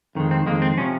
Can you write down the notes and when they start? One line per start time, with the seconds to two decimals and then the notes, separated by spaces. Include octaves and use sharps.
0.15 F2 D#3 G#3
0.31 C4
0.46 F2 D#3 G#3 A#3
0.62 C4
0.78 C3 F3 C#4